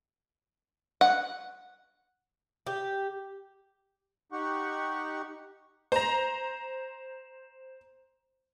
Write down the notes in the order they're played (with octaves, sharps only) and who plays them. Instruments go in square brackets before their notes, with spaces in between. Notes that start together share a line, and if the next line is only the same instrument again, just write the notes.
[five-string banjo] F#5
[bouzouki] G4
[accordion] D#4 G4 F#5 C#6
[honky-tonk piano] C5 A#5